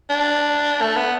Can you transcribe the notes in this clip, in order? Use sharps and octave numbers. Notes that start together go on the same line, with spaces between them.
D4
A3
B3